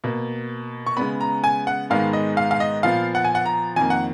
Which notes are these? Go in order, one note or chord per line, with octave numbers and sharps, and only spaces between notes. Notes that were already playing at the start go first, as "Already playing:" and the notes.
B2 A#3
C#6
C#3 G#3 B3 B5
A#5
G#5
F#5
G#2 D#3 G#3 B3 F5
D#5
F5
F5
D#5
A#2 F3 B3 F5
F#5
G#5
F#5
A#5
F2 D#3 A#3 G#5
F#5